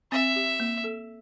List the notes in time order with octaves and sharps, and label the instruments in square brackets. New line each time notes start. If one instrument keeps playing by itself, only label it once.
[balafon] C4 [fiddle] E5
[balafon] G4
A#3
A4